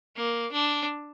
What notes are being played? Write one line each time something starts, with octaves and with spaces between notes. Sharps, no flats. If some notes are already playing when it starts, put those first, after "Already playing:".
A#3
D4